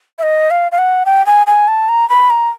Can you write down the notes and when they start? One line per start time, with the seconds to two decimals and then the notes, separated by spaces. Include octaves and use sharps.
0.19 E5
0.23 D#5
0.51 F5
0.72 F5
0.78 F#5
1.06 G5
1.26 G#5
1.47 G#5
1.68 A5
1.89 A#5
2.09 B5
2.30 A#5